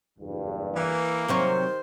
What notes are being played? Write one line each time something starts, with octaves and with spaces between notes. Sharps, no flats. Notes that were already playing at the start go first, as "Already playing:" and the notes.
F#1 E2 G2
E3 A#3
C3 D#3 F#3 C4 G4 C5 C#5